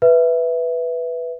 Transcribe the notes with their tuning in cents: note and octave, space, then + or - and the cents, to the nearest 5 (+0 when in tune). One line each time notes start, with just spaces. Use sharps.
B4 +0 E5 +0